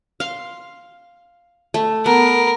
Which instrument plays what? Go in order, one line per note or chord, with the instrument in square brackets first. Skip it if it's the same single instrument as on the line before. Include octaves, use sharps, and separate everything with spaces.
[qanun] F5 C6
A3
[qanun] B3 [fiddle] A#4